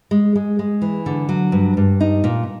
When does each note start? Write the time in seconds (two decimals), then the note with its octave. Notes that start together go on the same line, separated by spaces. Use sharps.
0.11 G#3
0.36 G#3
0.59 G#3
0.82 E3
1.06 D3
1.29 F#3
1.52 G2
1.77 G2
2.01 D#4
2.24 A#2